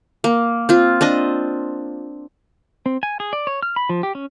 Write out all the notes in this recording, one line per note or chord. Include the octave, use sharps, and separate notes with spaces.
A#3
C4 F4
C4 D4 D#5
C4
G#5
G#4
D5
C#5
F6
B5
F3
G4
C#4